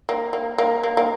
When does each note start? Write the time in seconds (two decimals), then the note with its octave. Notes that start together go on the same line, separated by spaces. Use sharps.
0.09 A#3
0.33 A#3
0.58 A#3
0.83 A#3
0.97 A#3